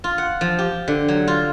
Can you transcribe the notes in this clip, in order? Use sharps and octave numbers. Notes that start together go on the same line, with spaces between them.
F4
F#5
F3
G4
D3
F#3
F4